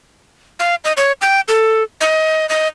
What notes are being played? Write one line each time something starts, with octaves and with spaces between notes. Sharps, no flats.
F5
D#5
C#5
G5
A4
D#5
D#5